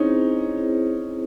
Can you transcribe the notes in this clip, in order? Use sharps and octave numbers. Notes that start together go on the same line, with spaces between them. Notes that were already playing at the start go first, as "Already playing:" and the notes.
Already playing: C4 C#4 D#4 E4 G#4 C5
C4 E4 G#4 C5